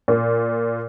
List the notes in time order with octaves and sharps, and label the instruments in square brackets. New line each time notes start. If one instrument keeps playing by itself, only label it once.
[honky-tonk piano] A#2